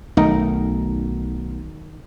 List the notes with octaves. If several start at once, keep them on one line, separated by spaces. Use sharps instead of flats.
B1 D#3 A3 D#4 A#4